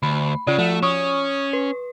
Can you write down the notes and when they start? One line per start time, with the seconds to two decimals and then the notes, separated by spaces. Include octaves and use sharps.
0.03 D2 B5
0.47 C#3 F4 D5
0.59 F3 A3 E7
0.83 C#4 C#6 D#6
1.53 B4